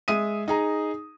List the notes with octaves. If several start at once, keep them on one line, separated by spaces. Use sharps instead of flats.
G#3 E5 D#6 D#7
D#4 G#4 A#5